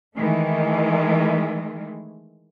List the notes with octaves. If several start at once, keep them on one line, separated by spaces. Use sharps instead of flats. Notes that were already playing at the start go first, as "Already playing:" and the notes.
D#3 E3 G#3 A3